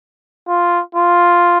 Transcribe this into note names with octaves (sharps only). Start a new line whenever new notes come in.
F4
F4